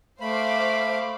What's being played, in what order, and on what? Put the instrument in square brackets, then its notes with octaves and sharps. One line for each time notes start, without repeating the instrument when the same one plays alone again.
[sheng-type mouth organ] A3 B5 [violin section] C5 F5 D6